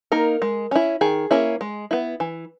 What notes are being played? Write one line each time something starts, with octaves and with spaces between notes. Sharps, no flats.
A#3 D#4 A#4
G#3
C#4 E4
D#3 G#4
A#3 C#4 E4
G#3
B3 E4
E3